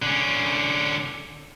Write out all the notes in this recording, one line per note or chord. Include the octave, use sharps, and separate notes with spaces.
D3 C#4